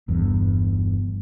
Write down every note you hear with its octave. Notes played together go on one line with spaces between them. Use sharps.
G1 E2 G2